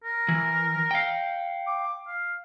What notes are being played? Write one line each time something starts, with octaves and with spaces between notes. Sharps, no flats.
A#4
E3
F5 G5
D6
F5